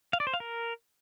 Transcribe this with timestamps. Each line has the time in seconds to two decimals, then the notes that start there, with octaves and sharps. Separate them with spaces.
0.13 F5
0.20 D5
0.27 C5
0.34 F5
0.40 A#4